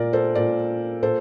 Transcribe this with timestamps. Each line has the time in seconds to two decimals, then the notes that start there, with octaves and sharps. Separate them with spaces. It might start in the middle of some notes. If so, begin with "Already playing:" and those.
Already playing: A#2 A#4 D5
0.13 A4 C5
0.35 A#2 A#4 D5
1.02 A#2 A4 C5